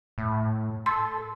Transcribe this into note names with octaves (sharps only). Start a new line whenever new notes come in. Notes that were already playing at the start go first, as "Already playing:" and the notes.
A2
A4 C6